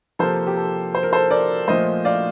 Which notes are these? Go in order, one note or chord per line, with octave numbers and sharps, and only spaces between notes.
C3 F3 A#3 A4 C5
G4
A4
C5
A#4
A4 C5
A#4 D5
A#2 F3 A3 C5 D#5
D5 F5